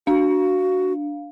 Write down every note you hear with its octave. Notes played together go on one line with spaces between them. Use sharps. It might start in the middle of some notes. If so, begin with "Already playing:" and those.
D4 F#4 F5